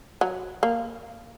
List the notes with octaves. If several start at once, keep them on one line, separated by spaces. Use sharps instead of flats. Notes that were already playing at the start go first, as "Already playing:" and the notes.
F#3
A#3